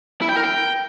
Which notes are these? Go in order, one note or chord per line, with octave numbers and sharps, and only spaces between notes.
E4
G5
A#4
G5